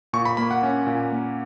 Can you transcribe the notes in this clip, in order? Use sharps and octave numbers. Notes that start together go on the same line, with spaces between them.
A#2 C#6
B5
A#3 B5
F#5
C#4
A#2
A#3